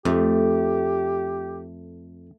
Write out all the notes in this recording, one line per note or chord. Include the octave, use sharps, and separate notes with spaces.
F2 A3 G4